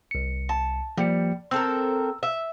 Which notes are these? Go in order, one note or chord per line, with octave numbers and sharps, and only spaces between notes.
C2 C#7
A5
F3 G3 A#3 C#7
C4 A4 A#4 E6
E5